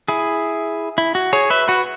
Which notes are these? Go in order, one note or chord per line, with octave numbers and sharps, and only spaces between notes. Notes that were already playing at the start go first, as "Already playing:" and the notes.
E4 G#4
E4
F#4
G#4 C#5
B4 E5
F#4 B4